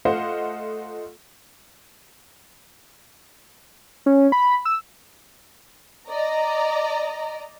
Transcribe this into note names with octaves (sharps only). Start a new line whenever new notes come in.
A3 F4 C5 D#5 F5 F#5
C#4
B5
E6
D5 D#5 A#5